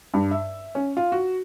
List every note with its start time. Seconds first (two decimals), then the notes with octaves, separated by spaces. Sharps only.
0.14 G2
0.31 E5
0.75 C#4
0.97 F4
1.12 F#4